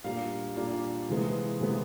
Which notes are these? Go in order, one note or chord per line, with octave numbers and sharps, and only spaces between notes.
A#2 G3 A#3 D4 F4 F5
A#2 G3 A#3 D4 F4
C3 E3 G#3 B3
C3 E3 G#3 B3